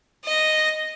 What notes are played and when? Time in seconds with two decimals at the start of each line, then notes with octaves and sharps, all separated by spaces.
0.25 D#5 A#6